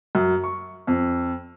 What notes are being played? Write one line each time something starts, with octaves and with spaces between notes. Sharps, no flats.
F#2
C#6
F2